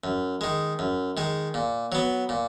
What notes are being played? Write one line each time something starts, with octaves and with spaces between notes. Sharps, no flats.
F#2
D#3 G#3
F#2
D#3 G#3
A#2
F#3 B3
A#2